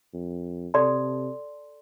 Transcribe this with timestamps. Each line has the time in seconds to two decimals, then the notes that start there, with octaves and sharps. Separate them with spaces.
0.14 F2
0.74 C3 A4 D5 A5 C6